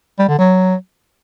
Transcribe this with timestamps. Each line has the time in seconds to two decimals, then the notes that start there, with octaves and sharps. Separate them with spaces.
0.19 G3
0.29 D3
0.38 F#3